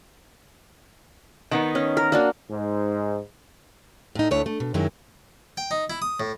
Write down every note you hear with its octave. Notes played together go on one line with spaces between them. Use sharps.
D#3 B3 D#4
C#4
A#4
A#3 D4 F#4
G#2
A2 D#4
D2 D3 A3 E4 C#5
A3
B2
F#2 D#3 F#3 G#3 E4
G5
D#4
E4
D#6
A2